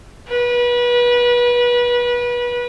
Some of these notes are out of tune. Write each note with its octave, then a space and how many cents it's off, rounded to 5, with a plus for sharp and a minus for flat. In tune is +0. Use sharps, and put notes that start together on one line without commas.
B4 -30